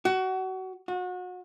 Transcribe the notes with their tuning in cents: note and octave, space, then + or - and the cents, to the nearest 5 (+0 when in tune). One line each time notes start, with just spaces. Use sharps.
F#4 +25
F#4 -30